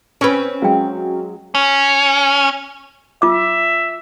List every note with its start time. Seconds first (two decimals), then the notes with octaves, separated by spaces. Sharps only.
0.21 C4 C#4 B4
0.62 F#3 G#3 F5 G5
1.55 C#4
3.22 F4 E5 D6